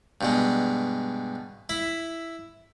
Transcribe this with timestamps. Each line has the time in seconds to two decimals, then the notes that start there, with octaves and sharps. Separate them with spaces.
0.21 G2 B2 G#3
1.69 E4 E5